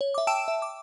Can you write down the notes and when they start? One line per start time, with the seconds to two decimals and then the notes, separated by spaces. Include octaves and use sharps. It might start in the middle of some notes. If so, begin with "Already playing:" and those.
0.01 C#5
0.14 E5 D6
0.27 G5 A5 E6 D7 E7
0.48 E5
0.62 D6